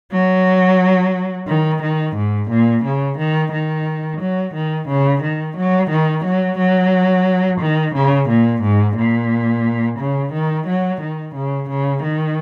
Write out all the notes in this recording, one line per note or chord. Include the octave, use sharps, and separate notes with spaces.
F#3
D#3
D#3
G#2
A#2
C#3
D#3
D#3
F#3
D#3
C#3
D#3
F#3
D#3
F#3
F#3
D#3
C#3
A#2
G#2
A#2
C#3
D#3
F#3
D#3
C#3
C#3
D#3